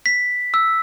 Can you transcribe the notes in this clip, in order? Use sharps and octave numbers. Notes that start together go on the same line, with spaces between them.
B6
E6